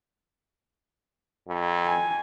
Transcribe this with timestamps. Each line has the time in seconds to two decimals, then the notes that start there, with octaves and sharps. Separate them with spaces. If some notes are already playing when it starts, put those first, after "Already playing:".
1.48 F2
1.86 G#5